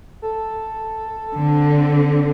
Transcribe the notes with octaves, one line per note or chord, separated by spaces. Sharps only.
A4
D3 C4